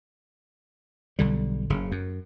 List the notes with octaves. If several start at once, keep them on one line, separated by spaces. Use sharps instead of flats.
B1 D3 G3
F#1 C#3
F#2